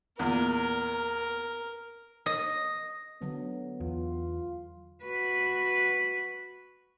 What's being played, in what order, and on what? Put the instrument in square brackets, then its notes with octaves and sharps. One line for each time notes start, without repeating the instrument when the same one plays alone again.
[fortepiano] E2 A#2 [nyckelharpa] A#4
[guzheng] D#5
[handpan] D3 F#3 [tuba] B3
[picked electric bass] E2 [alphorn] F4
[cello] F#4 B4